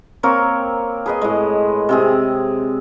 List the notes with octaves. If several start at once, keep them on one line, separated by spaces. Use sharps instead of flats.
A#3 C4 A#4 C#5
G#4 B4 D#5
A2 G#3
C3 C4 G#4